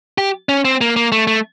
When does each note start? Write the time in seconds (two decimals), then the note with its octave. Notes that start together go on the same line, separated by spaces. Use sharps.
0.18 G4
0.49 C#4
0.65 C4
0.81 A#3
0.96 A#3
1.12 A3
1.27 A3